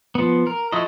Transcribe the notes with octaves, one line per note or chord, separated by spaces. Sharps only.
F3 B3
A#4
F3 E4 F#4 A4 D#5